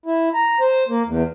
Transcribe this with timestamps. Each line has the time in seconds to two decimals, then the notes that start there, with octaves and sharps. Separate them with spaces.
0.06 E4
0.34 A#5
0.61 C5
0.89 A#3
1.06 E2